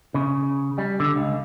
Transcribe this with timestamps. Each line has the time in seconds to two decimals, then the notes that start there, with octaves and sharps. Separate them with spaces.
0.14 C#3
0.78 G3
1.00 D3
1.16 C#2